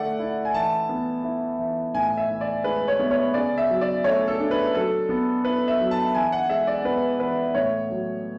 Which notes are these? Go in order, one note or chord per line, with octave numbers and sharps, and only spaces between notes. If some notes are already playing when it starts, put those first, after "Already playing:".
Already playing: D3 A3 D5 F#5
E4
G#5
E3 A5
B3
E4
E3
A2 G#5
E5
E3
D5
G#3 B4
C#5
B3
C#5
C#3 D5
E5
F#3
D5
A3 C#5
A4
D4
B4
F#3 A4
B3
E4 B4
E5
F#3
A5
E3 G#5
F#5
G#3 E5
D5
B3 B4
E3 B4
A2 C#5
F#3